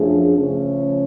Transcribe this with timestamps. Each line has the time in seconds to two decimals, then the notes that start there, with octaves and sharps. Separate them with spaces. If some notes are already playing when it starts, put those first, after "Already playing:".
Already playing: F#2 F3 A3 D4 G#4
0.37 C#3 F3 A3 C#4